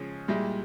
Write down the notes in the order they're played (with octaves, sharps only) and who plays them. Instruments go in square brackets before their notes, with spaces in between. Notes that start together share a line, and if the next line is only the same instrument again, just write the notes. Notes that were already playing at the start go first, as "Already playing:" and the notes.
Already playing: [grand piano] C#3 F3 G#3 C#4
[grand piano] A#2 G#3 E4 G4 [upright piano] G3